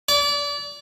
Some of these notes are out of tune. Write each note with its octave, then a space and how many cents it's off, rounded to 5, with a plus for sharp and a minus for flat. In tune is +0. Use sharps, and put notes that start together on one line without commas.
D5 -30